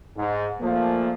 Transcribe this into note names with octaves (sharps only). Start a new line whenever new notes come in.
G#2
A#2 F3 A3 A#3